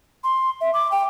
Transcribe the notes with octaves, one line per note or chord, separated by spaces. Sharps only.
C6
E5
D6
G5